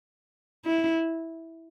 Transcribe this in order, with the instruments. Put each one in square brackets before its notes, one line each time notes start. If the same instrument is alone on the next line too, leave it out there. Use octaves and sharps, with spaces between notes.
[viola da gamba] E4